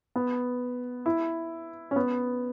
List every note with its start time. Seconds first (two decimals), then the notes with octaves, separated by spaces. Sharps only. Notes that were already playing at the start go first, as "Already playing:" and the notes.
0.16 B3
1.06 E4
1.91 C#4
1.96 B3